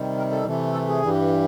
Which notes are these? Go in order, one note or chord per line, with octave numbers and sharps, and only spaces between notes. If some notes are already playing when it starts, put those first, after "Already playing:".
Already playing: C3 D#3 G3
A#4
A4
C3 E3 A3
A4
G#4
G2 E3 G3